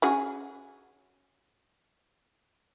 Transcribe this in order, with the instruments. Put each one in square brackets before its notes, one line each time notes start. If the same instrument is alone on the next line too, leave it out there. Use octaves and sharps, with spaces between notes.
[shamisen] C#4 F#4 G#4